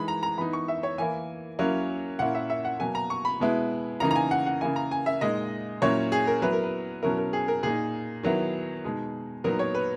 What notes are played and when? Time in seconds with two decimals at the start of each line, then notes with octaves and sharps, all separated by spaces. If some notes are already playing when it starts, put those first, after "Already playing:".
Already playing: E3 G#3 D#4 B5
0.08 A#5
0.23 A#5
0.38 E3 B3 D#4 B5
0.53 C#6
0.68 E5
0.83 C#5
0.98 E3 A#3 E4 G#5
1.59 F#3 A#3 C#4 E4
2.19 A#2 A#3 C#4 E4 F#5
2.35 E5
2.50 E5
2.65 F#5
2.80 B2 F#3 A#3 G#5
2.95 A#5
3.10 C#6
3.25 B5
3.40 B2 G#3 B3 E4
4.00 C#3 E3 A#3 D#4 A#5
4.11 A#5
4.16 G#5
4.31 F#5
4.46 F#5
4.61 C#3 E3 A#3 E4 G#5
4.76 A#5
4.91 G#5
5.06 E5
5.21 A#2 G#3 D#4 D#5
5.82 A#2 F#3 C#4 E4 C#5
6.12 G#4
6.27 A#4
6.42 F#3 B3 E4 B4
6.53 A#4
6.63 B4
7.03 B2 F#3 C#4 E4 A#4
7.18 A#4
7.33 G#4
7.48 A#4
7.63 A#2 A#3 D#4 G#4
8.23 D#3 F#3 B3 E4
8.84 B2 G#3 D#4
9.44 A#2 F#3 B3 D#4 A#4
9.59 C#5
9.75 B4